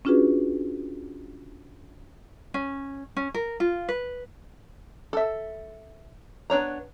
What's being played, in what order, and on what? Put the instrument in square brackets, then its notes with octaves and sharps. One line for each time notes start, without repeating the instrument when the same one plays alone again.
[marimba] C#4 D4 F4 F#4 G#4 B4
[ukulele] C#4
C#4
A#4
F4
B4
[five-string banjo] A4 E5
B3 D4 C#5 A#5